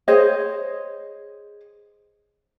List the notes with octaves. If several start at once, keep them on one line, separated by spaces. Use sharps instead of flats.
G#4 C5 C#5 D#5